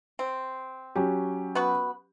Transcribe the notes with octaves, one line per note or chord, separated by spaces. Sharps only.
C4
F#3 C#4 G4
B3 F#4 B4